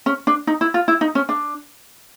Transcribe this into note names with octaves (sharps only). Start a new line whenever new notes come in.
C#4
D4
D#4
E4
F4
E4
D#4
C#4
D4